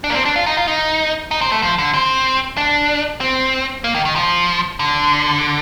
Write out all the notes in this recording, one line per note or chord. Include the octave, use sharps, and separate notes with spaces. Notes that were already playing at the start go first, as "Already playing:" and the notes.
D4
A#3
C4
D4
F4
D#4
F4
D#4
D#4
C4
A3
F3
D3
C4
D4
C4
A#3
D#3
D#3
F3
D3